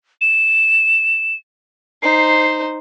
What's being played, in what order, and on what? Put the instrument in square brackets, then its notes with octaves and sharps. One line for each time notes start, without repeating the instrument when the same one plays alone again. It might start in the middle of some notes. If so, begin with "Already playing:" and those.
[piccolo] E7
[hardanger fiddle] D#4 C5 [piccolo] C7